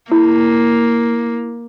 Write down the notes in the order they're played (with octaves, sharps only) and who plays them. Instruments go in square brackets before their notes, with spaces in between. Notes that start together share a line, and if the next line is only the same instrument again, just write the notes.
[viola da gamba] A#3 [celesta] E4